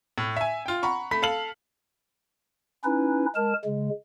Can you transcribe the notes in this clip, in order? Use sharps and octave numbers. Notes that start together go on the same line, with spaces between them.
A2
E5 G#5
F4 G5
F#5 A#5 B5 C#6
A3 B5 B6
A4 F5 F6 F#7
C#4 D#4 E4 B4
G#3 A#4 A5
C#3 G#3